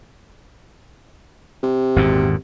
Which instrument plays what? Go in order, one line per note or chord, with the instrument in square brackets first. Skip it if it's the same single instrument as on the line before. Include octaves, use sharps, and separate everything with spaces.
[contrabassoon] C3
[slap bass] G#1 E2 A#2